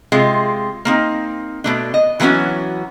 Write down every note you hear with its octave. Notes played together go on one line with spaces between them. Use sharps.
C3 G#3 F4
A#3 C4 D#4
B2 A3 D4
D#5
E3 F#3 A#3 B3 C#4 F#4